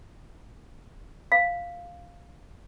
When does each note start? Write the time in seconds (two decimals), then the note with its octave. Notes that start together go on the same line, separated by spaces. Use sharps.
1.32 F5